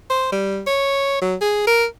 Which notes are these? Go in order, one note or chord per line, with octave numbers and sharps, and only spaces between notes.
C5
G3
C#5
F#3
G#4
A#4